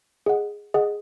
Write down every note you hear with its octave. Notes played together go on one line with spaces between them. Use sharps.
G#4 D#5 F#5
G#4 D#5 F#5